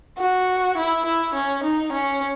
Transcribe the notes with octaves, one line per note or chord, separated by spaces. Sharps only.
F#4
E4
E4
C#4
D#4
C#4